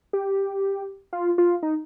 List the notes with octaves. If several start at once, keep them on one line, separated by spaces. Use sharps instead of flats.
G4
F4
F4
D#4